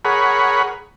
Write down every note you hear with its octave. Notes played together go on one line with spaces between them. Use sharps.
G#4 A#4 C#5 F#5 B5